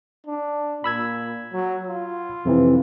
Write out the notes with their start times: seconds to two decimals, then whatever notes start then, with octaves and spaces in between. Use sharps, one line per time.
0.26 D4
0.84 A#2 B5 E6 G#6
1.53 F#3
1.87 F4
2.45 F2 C3 E3